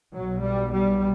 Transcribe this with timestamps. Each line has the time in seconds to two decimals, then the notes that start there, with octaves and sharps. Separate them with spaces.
0.14 B1 B2 F#3
0.43 G3
0.73 G3